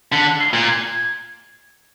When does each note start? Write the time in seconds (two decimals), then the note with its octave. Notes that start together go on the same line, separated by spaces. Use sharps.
0.11 D3 B6
0.40 C7
0.53 A#2
0.68 G#6